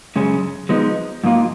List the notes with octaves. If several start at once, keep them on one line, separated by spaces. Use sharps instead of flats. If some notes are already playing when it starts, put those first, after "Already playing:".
F#2 C#3 G#3 C#4
F3 G#3 B3 D#4
G#2 F3 A#3 F4